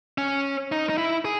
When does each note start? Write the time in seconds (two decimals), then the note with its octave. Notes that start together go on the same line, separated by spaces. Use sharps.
0.18 C#4
0.72 D#4
0.89 D#4
0.98 E4
1.25 G#4